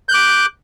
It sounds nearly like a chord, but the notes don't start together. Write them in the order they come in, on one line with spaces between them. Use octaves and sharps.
G6 F#6 D6